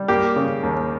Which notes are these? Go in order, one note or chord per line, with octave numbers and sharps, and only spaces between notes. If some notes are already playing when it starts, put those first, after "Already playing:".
Already playing: G3
A#3 G4
C#3
D#2